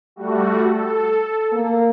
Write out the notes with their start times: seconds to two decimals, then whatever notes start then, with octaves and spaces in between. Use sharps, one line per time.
0.16 G3 A3 F#4
0.61 A4
1.52 A#3